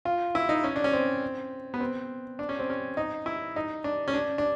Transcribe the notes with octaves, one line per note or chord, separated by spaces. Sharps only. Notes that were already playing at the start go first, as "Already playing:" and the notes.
F4
E4
D#4
C#4
D4
C#4
C4
B3
C4
D4
C#4
C4
C#4
D#4
E4
D#4
D4
C#4
D4
D4